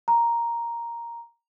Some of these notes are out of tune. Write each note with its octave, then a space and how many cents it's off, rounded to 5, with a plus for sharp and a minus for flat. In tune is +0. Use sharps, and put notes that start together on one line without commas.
A#5 +5